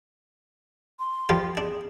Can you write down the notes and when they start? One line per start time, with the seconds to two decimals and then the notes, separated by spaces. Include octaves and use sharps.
0.99 C6
1.29 F3 G3 F4
1.57 D4 G#4